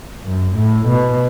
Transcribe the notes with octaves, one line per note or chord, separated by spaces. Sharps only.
F#2
A2
B2